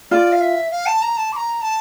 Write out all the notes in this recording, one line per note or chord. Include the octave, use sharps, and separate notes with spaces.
F4 D5
F5
E5
F5
A5
A#5
A5
D6
A#5
A5